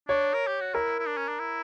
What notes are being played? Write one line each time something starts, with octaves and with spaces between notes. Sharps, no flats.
D4 C#5
A#4
G4
F#4
E4 A#4
E4
D4
C#4
D4
E4